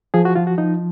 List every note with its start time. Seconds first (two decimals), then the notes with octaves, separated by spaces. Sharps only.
0.14 F3 G#4
0.25 F#4
0.36 F3 F4
0.47 F#4
0.58 F3 D#4